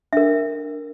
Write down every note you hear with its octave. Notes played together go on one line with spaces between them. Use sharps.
D4 A#4 E5